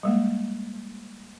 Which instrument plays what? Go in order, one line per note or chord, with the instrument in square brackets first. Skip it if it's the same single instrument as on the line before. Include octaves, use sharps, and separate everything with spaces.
[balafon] G3 G#3 A#3